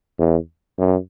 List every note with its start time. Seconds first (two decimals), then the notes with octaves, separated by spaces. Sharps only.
0.19 E2
0.78 F#2